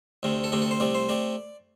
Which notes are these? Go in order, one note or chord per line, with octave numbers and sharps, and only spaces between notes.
D2 C3 A3
A4
D2 C3 A3 G4
A4
C5
C2 C3 A3 D5
C5
C3 A3 D5